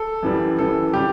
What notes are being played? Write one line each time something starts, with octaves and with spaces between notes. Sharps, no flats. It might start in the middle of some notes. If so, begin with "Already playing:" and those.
Already playing: A4
F#2 E3 G3
F#2 E3 G3 A4
C#3 E3 G3 G4